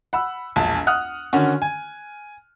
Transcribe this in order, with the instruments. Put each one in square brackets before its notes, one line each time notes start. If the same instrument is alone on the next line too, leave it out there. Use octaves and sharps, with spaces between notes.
[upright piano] F#5 B5 E6
E1 A#1 A5
F#5 D#6 F6 F#6
D3 D#3 C#4 F#4
G#5